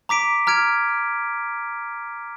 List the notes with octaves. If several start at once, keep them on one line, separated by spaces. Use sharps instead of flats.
A#5 D6 B6 D7
A#5 F6 G#6 D7